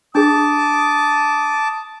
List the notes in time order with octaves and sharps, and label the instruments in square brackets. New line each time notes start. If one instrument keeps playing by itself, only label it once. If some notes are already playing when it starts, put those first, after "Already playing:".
[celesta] D4 G#4 [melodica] A5 D6 [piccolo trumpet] D#6